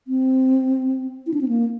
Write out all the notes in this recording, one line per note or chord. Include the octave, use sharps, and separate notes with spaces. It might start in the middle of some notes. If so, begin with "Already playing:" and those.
C4
E4
D4
C4
A#3